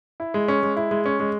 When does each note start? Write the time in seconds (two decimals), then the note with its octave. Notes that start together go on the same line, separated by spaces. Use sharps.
0.20 E4
0.34 G#3
0.48 C#4
0.63 G#3
0.77 E4
0.91 G#3
1.06 C#4
1.20 G#3